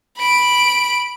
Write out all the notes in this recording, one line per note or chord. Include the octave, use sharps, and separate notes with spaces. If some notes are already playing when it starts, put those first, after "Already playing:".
B5 D7